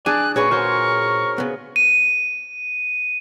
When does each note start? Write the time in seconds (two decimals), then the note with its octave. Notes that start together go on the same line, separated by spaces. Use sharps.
0.06 D4 G#4 D5 G#5 F#6
0.36 A#2 C#4 F#4 G#4 B4 C#5 C#6
0.51 F#4 A#4 C5 C#5
1.38 C#3 B3
1.76 D#7